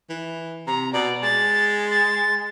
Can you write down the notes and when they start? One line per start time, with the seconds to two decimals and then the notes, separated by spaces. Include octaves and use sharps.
0.10 E3
0.67 C3 A#5
0.93 B2 D5
1.23 G#3 A6
1.91 A6